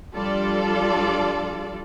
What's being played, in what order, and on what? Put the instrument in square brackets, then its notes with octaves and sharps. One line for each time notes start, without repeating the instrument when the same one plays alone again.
[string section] F3 G3 D4 F4 A4 D5